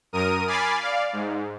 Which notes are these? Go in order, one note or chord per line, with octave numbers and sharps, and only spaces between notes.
F#2 A#4 D#6 D#7
G#5 B5 D6 F6 A6 C7
D5 F5
G#2